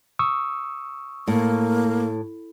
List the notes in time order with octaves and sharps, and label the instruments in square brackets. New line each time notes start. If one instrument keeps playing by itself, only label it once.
[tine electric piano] C#6 D#6 E6
[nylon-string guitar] A2 [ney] A#3